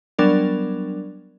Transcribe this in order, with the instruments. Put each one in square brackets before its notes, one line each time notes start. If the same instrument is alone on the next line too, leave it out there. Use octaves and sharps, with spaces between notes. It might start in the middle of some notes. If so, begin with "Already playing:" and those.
[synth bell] F#3 G3 B3 D4 A#4 D5